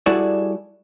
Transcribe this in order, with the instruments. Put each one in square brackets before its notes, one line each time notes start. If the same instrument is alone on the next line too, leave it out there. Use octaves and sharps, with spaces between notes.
[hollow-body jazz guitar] G3 E4 F#4 G#4 A4 D5